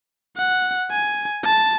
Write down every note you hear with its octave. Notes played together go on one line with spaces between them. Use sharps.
F#5
G#5
A5